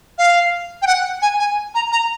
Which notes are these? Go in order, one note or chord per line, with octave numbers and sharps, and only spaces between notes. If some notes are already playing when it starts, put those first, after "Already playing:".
F5
G5
F#5
G#5
G#5
A#5
A#5